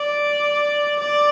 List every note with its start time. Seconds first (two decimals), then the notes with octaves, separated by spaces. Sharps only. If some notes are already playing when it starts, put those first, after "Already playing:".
Already playing: D5
1.01 D5